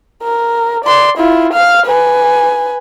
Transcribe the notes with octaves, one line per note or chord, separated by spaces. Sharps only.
A#4
D5 C6
E4 F4
F5 F6
B4 G#5